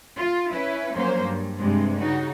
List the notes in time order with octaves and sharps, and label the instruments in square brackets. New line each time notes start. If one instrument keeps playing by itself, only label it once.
[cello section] F4
C#4 E4 B4
F3 F#3 A#3 C#4 C5
G2
G2 C3 G#3
C#3 D#4 F#4